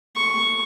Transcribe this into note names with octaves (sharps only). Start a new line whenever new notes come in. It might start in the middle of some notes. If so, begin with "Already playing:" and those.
C#6